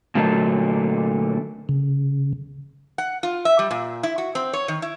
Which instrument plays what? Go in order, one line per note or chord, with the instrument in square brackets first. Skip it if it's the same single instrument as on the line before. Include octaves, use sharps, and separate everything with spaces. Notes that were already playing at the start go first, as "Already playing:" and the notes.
[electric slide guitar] A#2 D3 F#3 A3 A#3 A5
[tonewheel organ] C#3
[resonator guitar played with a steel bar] F#5
F4
E5
G3
A#2
E4
F#4
C4
C#5
D#3
E4